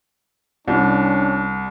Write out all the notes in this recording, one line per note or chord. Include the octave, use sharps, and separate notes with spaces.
C2 C#4 D4